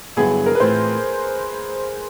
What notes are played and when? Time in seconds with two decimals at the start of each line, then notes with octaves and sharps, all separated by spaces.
0.17 G2 D3 F#3 B3 E4 G#4
0.46 A#4
0.55 B4
0.60 A2 E3 A3 C4 F4 C5